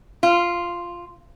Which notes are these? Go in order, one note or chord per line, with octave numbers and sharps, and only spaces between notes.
F4